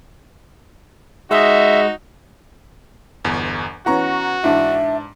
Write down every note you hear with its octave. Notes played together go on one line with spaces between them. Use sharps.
G#3 D#4 F#4 D#5 E5
G1 E2
E3 B3 C#4 F#4 F#5 A#5 C#6
G#2 E3 D4 E5